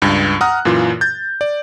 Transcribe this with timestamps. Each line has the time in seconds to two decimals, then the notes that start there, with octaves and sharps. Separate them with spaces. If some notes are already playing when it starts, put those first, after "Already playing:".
0.02 C#2 G2
0.41 F#5 A#5 D#6 F6 F#6
0.65 F#2 A#2 E3 F4
1.01 G6 A6
1.41 D5